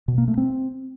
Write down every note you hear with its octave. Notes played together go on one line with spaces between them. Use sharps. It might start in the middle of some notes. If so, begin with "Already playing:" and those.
B2
A#3
A3
C4